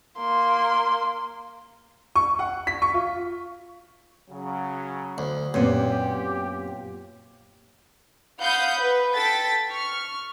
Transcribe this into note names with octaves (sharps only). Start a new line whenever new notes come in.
A#3 C6
C#6
F#5
B6
C#6
F4
C#3 F#3
D2
F#2 A#2 B3 C4 G4
F5 F#5 B5 D#6 G6
B4
A4 G5 A6 B6
C#6 F6